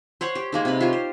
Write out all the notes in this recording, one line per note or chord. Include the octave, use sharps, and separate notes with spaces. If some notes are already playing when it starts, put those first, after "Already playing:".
C5 C#5 F#5 C#6
G4
G#3 A#3 D#4
C3 B4
F4 G4 C5 C#5
C5